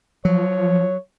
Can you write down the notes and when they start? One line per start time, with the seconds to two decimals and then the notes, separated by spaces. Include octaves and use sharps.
0.25 F3 F#3 C#5